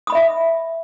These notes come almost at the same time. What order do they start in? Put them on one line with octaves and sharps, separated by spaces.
D#6 B5 D#5 E5